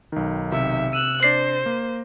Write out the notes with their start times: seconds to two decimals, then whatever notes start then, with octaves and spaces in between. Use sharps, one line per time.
0.12 B1 D#3
0.52 C3 E5
0.93 E6 F#6 D#7
1.23 D4 C5 D5 A#6 C7
1.66 A#3